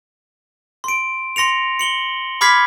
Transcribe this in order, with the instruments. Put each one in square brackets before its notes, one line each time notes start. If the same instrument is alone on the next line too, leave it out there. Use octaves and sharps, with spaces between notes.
[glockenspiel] C6 D7
C6 A#6 C#7 F7
C#7 F#7 G7
B5 D6 F6 G#6 B6 C7